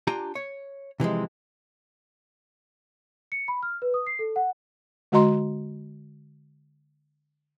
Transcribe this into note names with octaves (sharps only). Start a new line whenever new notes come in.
D4 F4 G4 G#5 A#5
C#5
C3 E3 F3 G#3
C#7
B5
F6
B4
D#6
C7
A4
F#5
D3 G#3 F#4 D#5 A#5 C6